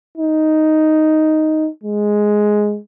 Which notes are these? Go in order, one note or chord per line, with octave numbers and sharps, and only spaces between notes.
D#4
G#3